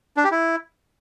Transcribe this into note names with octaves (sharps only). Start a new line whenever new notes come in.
D4
G4
E4